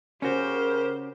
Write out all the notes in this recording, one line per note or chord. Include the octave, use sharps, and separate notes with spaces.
C#3 C#4 F#4 G4 A#4 C5